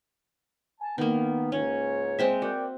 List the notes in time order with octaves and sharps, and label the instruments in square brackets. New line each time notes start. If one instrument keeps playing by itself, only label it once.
[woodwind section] G#5 A5
[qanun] D#3 A#3 [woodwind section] B3
[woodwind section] C#2 G#2 C#5 [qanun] C#4
[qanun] G#3 C4 E5
[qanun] F#4 [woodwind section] A#4 D5 G5